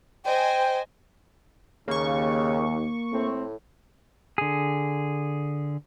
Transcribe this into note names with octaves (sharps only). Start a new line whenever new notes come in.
C5 D#5 G5 G#5
D#2 C#3 A#3 C#6
A2 A3 C4
D3 G#4